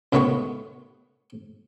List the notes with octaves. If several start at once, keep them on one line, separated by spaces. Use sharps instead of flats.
C#2 A2 D#3 B3 F#4 C#6